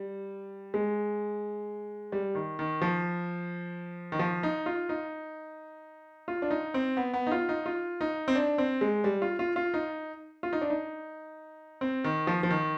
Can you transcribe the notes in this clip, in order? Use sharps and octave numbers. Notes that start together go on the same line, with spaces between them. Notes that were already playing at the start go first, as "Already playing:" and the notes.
Already playing: G3
G#3
G3
D#3
D#3
F3
D#3
F3
D#4
F4
D#4
F4
D4
D#4
C4
B3
B3
D#4
F4
D#4
F4
D#4
C4
D4
C4
G#3
G3
F4
F4
F4
D#4
F4
D#4
D4
D#4
C4
D#3
F3
F3
D#3